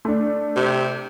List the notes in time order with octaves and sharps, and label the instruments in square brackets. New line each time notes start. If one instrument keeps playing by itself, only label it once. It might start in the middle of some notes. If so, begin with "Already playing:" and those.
[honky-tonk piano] A3 D4
[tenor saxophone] C3